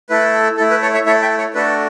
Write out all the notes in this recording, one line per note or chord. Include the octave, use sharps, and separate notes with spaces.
A3 E4 A4 B4
A3 E4 A4
B4
A4 C#5
C#5 E5
A3 E4 A4 C#5 E5
E5 G5
A4 C#5
A3 D4 F#4 A4 B4